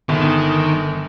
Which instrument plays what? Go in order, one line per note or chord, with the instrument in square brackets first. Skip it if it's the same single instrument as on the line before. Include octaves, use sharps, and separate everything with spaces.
[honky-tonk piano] G1 [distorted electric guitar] D#3